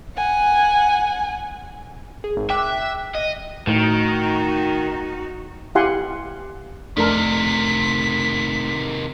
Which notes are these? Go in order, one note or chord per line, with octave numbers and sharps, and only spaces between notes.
F#5 G#5
G#4
G#1
E5 G5 D6 F#6
D#5
A2 D#3 D#4 F#4
E4 G4 F5 F#5 G#5 C6
F2 C3 D#3 A3 D4 A4 A#4 B6